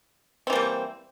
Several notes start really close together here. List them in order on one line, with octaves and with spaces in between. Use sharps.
C4 E3 A#3 G3